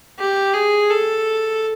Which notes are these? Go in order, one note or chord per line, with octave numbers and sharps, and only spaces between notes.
G4
G#4
A4